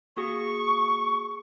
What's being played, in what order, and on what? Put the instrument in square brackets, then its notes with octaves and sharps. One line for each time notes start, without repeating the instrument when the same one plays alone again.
[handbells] A#3 F#4 G#4 [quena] C#6